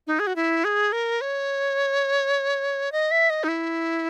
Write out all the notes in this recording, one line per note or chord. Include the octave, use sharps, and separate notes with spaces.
D#4
G#4
F#4
E4
G#4
A#4
C#5
D#5
E5
D#5
D#4
E4